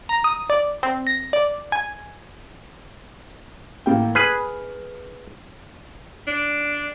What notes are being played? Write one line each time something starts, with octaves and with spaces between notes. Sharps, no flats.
A#5
D#6
D5
C4
A#6
D5
G#5
A1 A#3 G5
G#4 B4 F6
D4